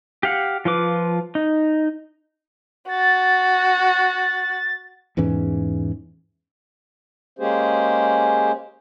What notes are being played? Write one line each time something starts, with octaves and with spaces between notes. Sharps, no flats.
G4 F5 F#5
F3 F4 B4 D6
D#4
F#4 A6
E2 G#2 E3 C#4
G#3 A#3 C#4 G4 G#4 C5